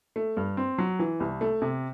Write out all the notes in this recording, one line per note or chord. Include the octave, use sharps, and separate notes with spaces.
A3
G2
C4
F#3
E3
C2
A3
C3